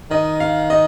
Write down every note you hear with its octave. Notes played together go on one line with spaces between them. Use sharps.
D#3 D#5
F5
D#5